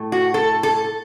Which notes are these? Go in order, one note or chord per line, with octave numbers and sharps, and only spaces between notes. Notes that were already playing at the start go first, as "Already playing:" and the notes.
Already playing: A2 A3
F#4
A4
A4